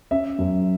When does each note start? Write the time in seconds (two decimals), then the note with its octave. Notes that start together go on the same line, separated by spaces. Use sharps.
0.11 C#4 E5
0.38 F#2